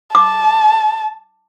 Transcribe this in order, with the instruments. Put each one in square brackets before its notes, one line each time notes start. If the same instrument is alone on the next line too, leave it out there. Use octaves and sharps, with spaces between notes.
[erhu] A5 [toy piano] D6